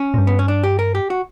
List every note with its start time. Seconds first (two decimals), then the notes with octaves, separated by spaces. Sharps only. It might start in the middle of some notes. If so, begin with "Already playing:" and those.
Already playing: C#4
0.14 A#2
0.18 G2
0.27 B3
0.39 C#4
0.48 D4
0.63 G4
0.79 A#4
0.95 G4
1.10 F#4